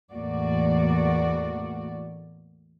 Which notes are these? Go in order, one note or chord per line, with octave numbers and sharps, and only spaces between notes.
E2 A2 A#3 F#4 D5